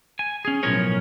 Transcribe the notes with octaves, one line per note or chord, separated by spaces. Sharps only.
G#5
C#4 G#4
B1 A2 F3 C#4 A#4 C#5